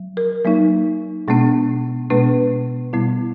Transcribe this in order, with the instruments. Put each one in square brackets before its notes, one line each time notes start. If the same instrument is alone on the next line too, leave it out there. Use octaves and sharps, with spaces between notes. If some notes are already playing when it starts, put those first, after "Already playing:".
Already playing: [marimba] F#3
A#4
F#3 A#3 D#4
B2 G#3 B3 D4
B2 G#3 B3 D4 B4
B2 G3 B3 E4